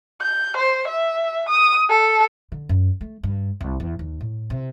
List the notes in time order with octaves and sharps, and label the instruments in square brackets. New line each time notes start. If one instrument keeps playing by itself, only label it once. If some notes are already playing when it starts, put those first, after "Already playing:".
[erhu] G6
C5
E5
D#6
A4
[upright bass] D3
F#2
A3
G2
C2
E2
D#2
A2
C3